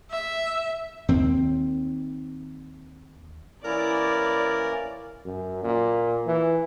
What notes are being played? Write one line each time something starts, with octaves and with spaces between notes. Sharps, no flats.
E5
D#2 C4
E3 A#3 C#4 E4 A#4 D5
F#2
A#2
E3